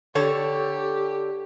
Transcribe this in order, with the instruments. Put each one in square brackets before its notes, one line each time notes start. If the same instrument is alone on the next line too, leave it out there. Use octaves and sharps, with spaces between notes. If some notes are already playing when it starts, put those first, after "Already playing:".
[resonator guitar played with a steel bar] D3 A4 C#5 [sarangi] G4